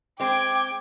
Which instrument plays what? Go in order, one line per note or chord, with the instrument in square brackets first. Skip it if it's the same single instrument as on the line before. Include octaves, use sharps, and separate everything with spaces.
[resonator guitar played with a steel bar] G#3 C4 [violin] G5 G#6 [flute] D6